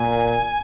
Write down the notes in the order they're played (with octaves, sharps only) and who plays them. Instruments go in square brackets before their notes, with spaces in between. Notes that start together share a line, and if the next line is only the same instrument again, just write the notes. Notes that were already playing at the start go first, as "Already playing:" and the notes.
Already playing: [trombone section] A#2 [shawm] G#5